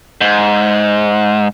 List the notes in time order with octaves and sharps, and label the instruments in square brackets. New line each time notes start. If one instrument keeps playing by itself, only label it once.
[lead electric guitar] G#2